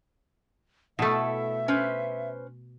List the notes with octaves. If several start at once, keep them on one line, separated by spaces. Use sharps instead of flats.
B2 A3 E4 A4 E5
C#4 B4 C5